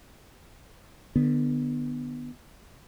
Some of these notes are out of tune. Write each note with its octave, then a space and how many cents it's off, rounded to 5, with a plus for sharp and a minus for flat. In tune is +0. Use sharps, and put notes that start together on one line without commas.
D3 +25 B3 +0